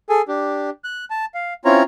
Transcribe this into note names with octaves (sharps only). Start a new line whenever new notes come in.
G#4 A4 G#5
D4 G4
F#6
A5
F5
C4 C#4 E4 F4 C#5 A#5